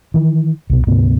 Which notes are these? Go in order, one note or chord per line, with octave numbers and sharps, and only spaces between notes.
D#3 E3
C2 B2
D2 G#2 C3 B3